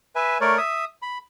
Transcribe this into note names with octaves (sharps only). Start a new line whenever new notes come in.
B4 E5 G#5
A3 A#4 C#5 D5
E5 D#6
B5